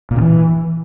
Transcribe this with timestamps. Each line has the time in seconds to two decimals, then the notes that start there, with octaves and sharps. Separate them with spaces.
0.11 A#2
0.16 C#3
0.21 E3